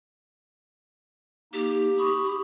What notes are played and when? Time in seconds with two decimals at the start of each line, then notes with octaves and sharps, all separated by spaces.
1.53 A#3 D#4 G4
1.98 B5 C#6 D#6